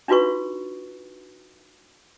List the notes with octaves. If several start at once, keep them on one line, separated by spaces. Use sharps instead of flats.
D4 D#4 F4 F#4 B4 C#6